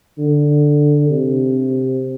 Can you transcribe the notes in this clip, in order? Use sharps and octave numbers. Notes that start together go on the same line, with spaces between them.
D3
C3